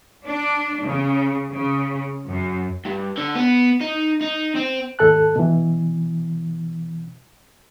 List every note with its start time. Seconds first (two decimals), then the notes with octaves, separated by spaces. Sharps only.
0.26 D4
0.85 C#3
1.51 C#3
2.27 F#2
2.86 G2
3.18 D3
3.35 B3
3.81 D#4
4.22 D#4
4.56 C4
4.99 D#2 G#2 A4 A5 F#6
5.36 B2 E3